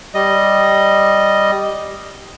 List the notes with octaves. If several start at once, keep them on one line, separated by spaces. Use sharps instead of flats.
G3 D#5